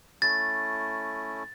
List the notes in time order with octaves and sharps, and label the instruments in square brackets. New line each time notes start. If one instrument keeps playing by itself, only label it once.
[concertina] A3 C#4 E4 [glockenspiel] A6